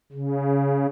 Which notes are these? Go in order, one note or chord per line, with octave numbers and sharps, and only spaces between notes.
C#3